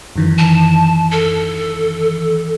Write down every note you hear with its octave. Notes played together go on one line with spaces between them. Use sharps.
F#2 D#3 E3
A5
A4